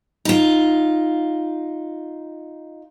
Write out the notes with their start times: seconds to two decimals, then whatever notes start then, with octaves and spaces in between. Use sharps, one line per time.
0.25 D#4 F4